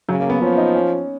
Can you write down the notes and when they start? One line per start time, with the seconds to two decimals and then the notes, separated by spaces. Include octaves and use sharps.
0.09 C#3 F#3
0.20 A#3
0.30 B3
0.42 F3 C#4
0.57 D#4
0.75 C#4